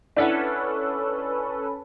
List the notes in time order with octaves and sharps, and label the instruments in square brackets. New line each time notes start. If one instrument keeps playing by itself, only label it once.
[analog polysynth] C#4 A4 B4 [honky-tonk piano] D4 E4 F#5